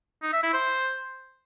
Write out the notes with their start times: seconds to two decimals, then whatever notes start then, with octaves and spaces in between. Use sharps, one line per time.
0.23 D#4
0.33 E5
0.43 E4
0.53 C5